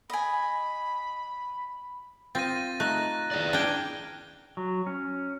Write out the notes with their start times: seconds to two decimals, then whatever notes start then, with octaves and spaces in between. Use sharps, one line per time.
0.10 D#5 G#5 B5
2.35 C4 F4 D#6 A6 A#6 D#7
2.80 A3 D#4 F#6 A#6
3.31 E4 G#4 D5
3.53 D4 G5 F6 G#6 G7
4.57 F#3
4.87 C#4